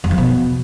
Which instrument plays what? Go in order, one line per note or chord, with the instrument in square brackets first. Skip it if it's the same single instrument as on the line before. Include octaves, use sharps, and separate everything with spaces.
[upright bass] F2
F3
B2